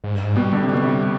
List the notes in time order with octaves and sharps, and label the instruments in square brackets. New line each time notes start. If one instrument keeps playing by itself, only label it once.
[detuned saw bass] G#2
G2
G#2
[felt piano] B2 [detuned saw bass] G3
[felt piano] D3
C3
[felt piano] B2 [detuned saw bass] G3
[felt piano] C3